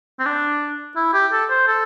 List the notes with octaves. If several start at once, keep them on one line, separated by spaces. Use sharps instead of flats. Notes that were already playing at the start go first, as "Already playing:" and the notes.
C4
D4
E4
G4
A4
C5
A4